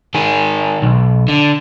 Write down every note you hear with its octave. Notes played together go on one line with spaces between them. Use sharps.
D#3 G#4
B1
D3